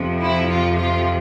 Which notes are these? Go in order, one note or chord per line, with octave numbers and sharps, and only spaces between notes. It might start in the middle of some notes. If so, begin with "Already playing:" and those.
Already playing: F2 C3 F3
E4
F4
F4